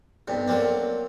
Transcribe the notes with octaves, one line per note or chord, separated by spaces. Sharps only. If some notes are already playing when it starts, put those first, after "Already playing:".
B1 G2 C3
F#3 A#3 C4 D4